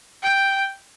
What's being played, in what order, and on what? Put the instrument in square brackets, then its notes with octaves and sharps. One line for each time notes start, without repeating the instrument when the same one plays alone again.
[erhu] G5